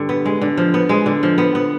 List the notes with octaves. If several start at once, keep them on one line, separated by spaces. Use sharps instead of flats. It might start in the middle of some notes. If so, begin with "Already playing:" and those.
Already playing: G2 D3
B3
G#3
D3
F3
B3
G#3
D3
F3
B3
B3